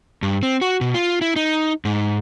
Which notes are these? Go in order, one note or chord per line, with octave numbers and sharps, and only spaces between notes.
G2
C4
F#4
B2
F4
E4
D#4
G#2